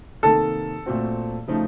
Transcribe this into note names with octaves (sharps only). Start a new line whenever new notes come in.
C3 D#3 A#3 A4
A#2 A3 C4 F#4
C#3 F3 A3 D#4